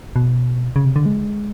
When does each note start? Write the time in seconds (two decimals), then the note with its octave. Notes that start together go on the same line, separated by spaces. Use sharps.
0.16 B2
0.76 C#3
0.85 C3
0.96 D3
1.06 G#3